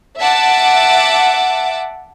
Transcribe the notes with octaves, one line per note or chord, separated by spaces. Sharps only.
E5 F#5 A5 D6